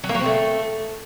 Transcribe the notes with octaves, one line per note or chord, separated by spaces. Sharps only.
F#3
A#3
F#3
C4
A3